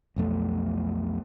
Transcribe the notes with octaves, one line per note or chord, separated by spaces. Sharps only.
B1 F2 A3